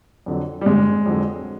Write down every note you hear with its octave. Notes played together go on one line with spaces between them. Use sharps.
F2 D3 F#3
G3
G1 G#3
F2 D3 F#3